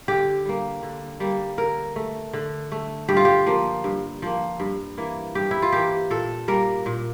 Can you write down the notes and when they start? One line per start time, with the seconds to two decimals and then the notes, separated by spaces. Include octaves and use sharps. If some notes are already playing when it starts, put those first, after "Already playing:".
0.08 D3 G4
0.45 G3 A#3
0.83 D3
1.20 G3 A#3
1.58 D3 A#4
1.96 A3
2.33 D3
2.72 A3
3.09 G2 G4
3.17 F4
3.25 G4
3.46 F3 A#3
3.84 G2
4.22 F3 A#3
4.60 G2
4.98 E3 A#3
5.35 G2 G4
5.51 E4
5.62 F4
5.72 E3 A#3 G4
6.11 A#2 A4
6.48 G3 A#3 A#4
6.86 A#2